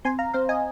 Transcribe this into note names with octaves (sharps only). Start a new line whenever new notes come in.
C4 G#5 C6
F5 A#5
C4 C5 F5
D#5 G#5